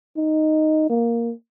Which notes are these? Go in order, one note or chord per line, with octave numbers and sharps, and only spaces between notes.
D#4
A#3